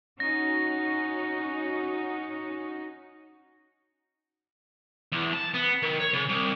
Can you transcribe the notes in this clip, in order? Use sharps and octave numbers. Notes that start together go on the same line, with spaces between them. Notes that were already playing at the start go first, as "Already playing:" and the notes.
C#4 D#4 F#4 A#6
E2
A5
B3
D#3
C#5
C#3
C2